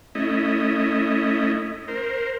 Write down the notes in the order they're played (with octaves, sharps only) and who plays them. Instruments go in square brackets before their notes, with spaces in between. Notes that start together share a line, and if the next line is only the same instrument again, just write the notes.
[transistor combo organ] A3 C#4 E4 D#5
A#4 C5